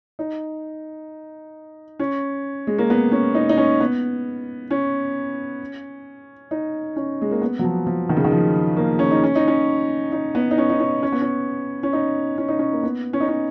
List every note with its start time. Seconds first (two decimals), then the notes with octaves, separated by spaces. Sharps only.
0.19 D#4
1.99 C#4
2.67 G#3
2.78 A#3
2.90 B3
3.12 C#4
3.35 D#4
3.49 D#4
3.58 C#4
3.80 B3
4.71 C#4
6.51 D#4
6.96 C#4
7.22 G#3
7.31 A#3
7.41 B3
7.59 F#3
7.64 F3
7.87 F3
8.09 D#3
8.17 C#3
8.24 D#3
8.32 F3
8.77 A#3
8.99 C#4
9.11 D#4
9.23 C#4
9.36 D#4
9.48 C#4
10.12 D#4
10.35 B3
10.51 D#4
10.58 C#4
10.70 D#4
10.80 C#4
11.03 C#4
11.12 B3
11.21 C#4
11.83 C#4
11.93 D#4
12.38 C#4
12.48 D#4
12.59 C#4
12.72 A#3
12.83 B3
13.13 C#4
13.20 D#4
13.28 C#4